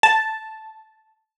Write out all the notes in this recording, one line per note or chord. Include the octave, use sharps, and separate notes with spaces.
A5